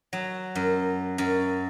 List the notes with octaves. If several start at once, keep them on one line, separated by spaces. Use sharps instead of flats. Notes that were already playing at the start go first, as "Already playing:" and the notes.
F#3
F#2
F#2